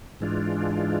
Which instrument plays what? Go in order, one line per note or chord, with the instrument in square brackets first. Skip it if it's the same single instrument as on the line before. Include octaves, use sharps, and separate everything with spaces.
[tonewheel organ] G#2 E3 G#3 D4 F4